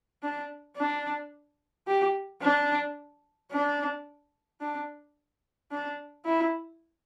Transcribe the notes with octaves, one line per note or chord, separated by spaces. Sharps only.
D4
D4
G4
D4
D4
D4
D4
E4